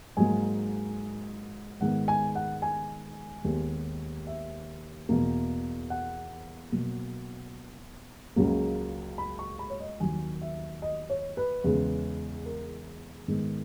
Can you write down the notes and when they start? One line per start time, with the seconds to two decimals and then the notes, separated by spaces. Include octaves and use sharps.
0.17 G#2 F#3 A#3 G#5
1.80 G#2 D#3 G#3 B3 F#5
2.08 G#5
2.35 F#5
2.62 G#5
3.44 D#2 D#3 G#3 B3
4.27 E5
5.09 E2 B2 A#3
5.90 F#5
6.72 B2 F#3 A#3
8.36 C#2 C#3 F#3 A#3
9.18 B5
9.39 C#6
9.59 B5
9.70 C#5
9.80 D#5
10.00 D#2 D#3 F#3 G#5
10.41 E5
10.82 D#5
11.10 C#5
11.37 B4
11.64 E2 C#3 G#3
12.46 A#4
13.28 G#2 D#3 G#3 B3